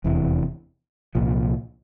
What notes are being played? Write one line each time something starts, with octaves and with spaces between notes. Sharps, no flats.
F1 E2 C3 E3
C2 A#2 F3